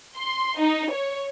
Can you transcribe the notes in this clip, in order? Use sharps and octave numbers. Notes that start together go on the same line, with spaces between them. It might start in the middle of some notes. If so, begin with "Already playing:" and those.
C6
D#4
C#5